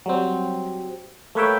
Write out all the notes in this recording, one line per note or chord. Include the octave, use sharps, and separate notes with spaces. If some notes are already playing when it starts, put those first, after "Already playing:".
F#3 G3 C4
A3 A#3 B4 C#5 E5 G5